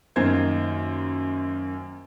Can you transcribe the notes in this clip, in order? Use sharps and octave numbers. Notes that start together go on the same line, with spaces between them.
F#2 D#3 A#3 F4 C5 G#6